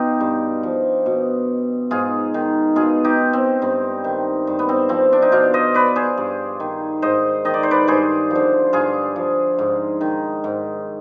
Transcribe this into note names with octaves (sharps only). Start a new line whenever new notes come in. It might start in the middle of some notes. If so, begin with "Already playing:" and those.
Already playing: B2 D#4 F4 G4
G2
F3
B2
G#2 F4 G#4
D#3
B2 F4 G#4
D#4 G4
C4
G2 C4
D#3
G2
B3
C4
F3 C4
D4
D#4
B2 D4 F4
C5 D#5
B4 D5
G#4 C5
G2
D#3
G#2 C5 D#5
D#3 D#5
D5
C5
B4 D5
G2 G#4 C5
D3 F3
G2 F4 G#4
F3
G#2
D#3
G#2